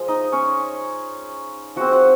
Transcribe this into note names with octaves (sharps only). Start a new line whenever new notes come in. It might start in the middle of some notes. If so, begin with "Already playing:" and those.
Already playing: F3 G#3
D#4 D#5
C#4 C#5
F3 G#3 C4 F#4 F#5
F#4 F#5